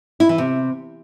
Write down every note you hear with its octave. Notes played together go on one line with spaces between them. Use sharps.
E4
E3
C3